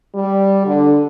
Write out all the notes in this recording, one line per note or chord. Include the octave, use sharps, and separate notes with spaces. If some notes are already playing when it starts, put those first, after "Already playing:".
G3
D3